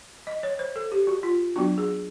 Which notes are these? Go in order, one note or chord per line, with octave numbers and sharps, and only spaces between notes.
D#5
C#5
C5
A4
G4
F#4
F4
F#3 B3 D4 F#4
G#4